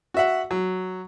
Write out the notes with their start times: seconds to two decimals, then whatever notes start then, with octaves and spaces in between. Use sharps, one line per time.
0.14 F#4 E5 F#5
0.51 F#3